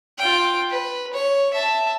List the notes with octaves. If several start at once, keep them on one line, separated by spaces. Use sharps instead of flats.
F4 G5
B4
C#5
E5 A5